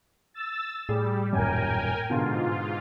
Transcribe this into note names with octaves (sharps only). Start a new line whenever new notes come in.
E6 A6
A2 G3 G#4
D#1 F#2 A#4 G5 G#5
G#2 B2 D3 F4